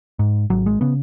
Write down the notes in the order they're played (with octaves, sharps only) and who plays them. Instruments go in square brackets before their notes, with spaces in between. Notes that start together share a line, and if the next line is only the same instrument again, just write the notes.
[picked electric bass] G#2
G#1 F#3
G#3
C#3 B3